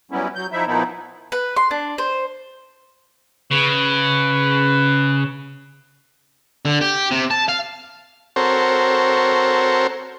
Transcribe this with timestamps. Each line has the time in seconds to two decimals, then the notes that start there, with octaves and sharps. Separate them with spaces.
0.11 F#2 F#3 G3 B3 C#4 E4
0.35 F#3 G6
0.52 F3 D#4 E4 E5
0.67 A#2 D#3 F3 B3 D#4 E4
1.32 B4
1.56 C6
1.71 D4
1.98 C5
3.51 C#3 B4
6.65 D3
6.81 G4
7.11 C3
7.30 A5
7.48 F5
8.36 C4 F#4 A4 A#4 C5 C#5